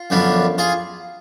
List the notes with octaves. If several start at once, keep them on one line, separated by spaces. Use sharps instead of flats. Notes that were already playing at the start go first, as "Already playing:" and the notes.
Already playing: F4
F#2 D3 F3 B3 D4
F4 G#4